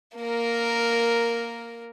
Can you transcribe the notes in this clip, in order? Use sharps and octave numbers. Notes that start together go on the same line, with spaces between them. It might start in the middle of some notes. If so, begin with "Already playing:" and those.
A#3 A#4